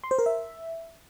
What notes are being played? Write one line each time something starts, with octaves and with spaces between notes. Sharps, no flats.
C6
C5
A#4
E5